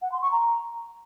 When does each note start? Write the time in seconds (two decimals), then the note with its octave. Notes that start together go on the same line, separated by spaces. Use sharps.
0.02 F#5
0.12 C6
0.22 C#6
0.32 A#5